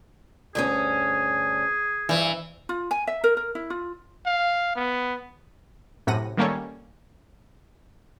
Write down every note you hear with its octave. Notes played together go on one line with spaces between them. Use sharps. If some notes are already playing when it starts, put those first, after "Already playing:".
D2 G2 C#4 G#4
G2 E3 C4
F4
G#5
E5
A#4
A#4
E4
F4
F5
B3
F#2 A2 C3 F#5 A#6 D#7
D#3 G3 A#3 C#4 A4 C#5